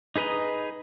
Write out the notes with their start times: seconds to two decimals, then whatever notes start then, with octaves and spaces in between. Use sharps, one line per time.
0.16 D#4 G#4 B4 D#5 A#5